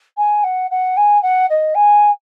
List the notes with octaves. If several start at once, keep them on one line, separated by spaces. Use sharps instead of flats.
G#5
F#5
F#5
G#5
F#5
D#5
G#5